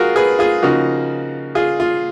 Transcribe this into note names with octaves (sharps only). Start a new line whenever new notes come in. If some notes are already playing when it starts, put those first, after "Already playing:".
Already playing: F4 F#4 G#4 A#4
G#4 B4
F4 G#4
C#3 F3 A#3 D#4 F#4
F4 G#4
F4